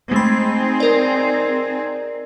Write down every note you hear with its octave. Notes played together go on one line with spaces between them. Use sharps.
G#3 A3 C4 D#4 G#4 B5
A#4 D5